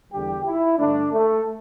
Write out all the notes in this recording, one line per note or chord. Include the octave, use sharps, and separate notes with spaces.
E2 D3 G3 G4
E4
G2 D3 A3 D4
A3